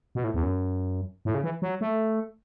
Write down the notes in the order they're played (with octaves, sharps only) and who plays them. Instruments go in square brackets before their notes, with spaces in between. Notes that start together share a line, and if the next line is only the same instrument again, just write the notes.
[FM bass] B2
A2
E2
F#2
A2
C#3
E3
F#3
A3